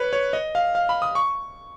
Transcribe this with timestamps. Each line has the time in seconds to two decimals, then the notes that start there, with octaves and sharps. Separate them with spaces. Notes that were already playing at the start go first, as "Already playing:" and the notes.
Already playing: B4 C#5
0.13 C#5
0.33 D#5
0.55 F5
0.75 F5
0.89 B5
1.02 D#6
1.15 C#6